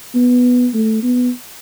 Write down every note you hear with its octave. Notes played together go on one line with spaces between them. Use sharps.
B3
A3
B3